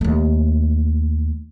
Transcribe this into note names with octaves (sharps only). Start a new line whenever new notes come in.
D#2 A3